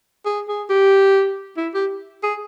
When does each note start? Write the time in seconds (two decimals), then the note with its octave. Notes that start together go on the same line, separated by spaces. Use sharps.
0.26 G#4
0.48 G#4
0.70 G4
1.57 E4
1.74 G4
2.23 G#4